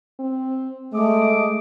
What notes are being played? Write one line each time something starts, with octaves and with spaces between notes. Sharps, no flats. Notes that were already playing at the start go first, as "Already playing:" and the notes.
C4
G#3 A3 D#5 D6